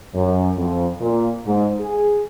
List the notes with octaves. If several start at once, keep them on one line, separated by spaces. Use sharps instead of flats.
F#2
F2
A#2
G#2
G#4